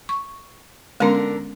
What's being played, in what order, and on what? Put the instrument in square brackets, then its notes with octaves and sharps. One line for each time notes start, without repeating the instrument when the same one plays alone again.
[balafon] C#6
[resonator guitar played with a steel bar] D3 A#4 [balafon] G#3 B3 C#4